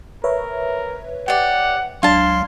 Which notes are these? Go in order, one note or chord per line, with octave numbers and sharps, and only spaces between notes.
A#4 B4 C#5 E5
G4 D5 F#5
C#2 F#3 D4 F5 A5 C6 G#6